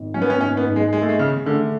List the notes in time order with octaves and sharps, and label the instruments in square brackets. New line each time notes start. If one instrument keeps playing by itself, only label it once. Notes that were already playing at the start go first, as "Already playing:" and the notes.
Already playing: [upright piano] G#1
[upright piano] F#3 [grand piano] C#4
[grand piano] B3
C#4
[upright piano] G#1 [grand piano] C#4
[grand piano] B3
[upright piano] G#2
[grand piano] G#3
[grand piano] G#3 [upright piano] G#4
[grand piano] A3
G#3
[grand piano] C#3 [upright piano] G#4
[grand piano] D3 [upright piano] A3